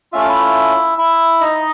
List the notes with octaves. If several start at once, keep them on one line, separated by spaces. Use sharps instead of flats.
A3 C#4 F4 E5
F5
E4 E5
E4 E5
D#4 D#5